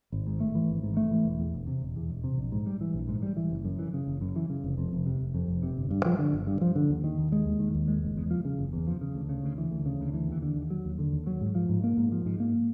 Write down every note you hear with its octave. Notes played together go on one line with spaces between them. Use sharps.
G#1
G#2
A3
E3
G#1
G#2
A3
E3
E1
E2
E1
C3
E1
E2
E1
C3
A#1
G#2
G3
E3
A#1
G#2
G3
E3
F#1
F#2
E3
C#3
F#1
F#2
E3
C#3
F1
F2
F1
C3
F1
F2
F1
C3
G1
G2
F3
D3
G1
G2
F3
D3
D#2
D#3
D#2
G#3
D#2
D#3
D#2
G#3
F#1
E2
F3
C#3
F#1
E2
F3
C#3
D2
C#3
D2
E3
D2
C#3
D2
E3
D#2
D3
D#2
F#3
D#2
D3
D#2
F#3
G#2
F3
G#2
A#3
G#2
F3
G#2
A#3